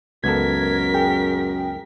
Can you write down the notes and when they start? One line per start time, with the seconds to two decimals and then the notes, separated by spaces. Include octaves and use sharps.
0.24 C#2 F#2 B3 A4 A#4 G#6 B6
0.94 G#4 G5